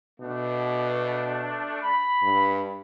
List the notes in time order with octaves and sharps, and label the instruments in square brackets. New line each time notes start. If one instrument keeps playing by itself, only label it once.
[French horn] B2 [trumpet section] A3 D4
[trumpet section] B5
[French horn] G2